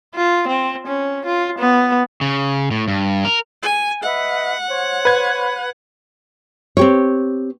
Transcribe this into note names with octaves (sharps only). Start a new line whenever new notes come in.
F4
C4
C#4
F4
B3
C#3
A2
G2
A#4
G#5
B4 D#5 E5 F#5
C5 C#5
B4 G#6
C4 G4 C#5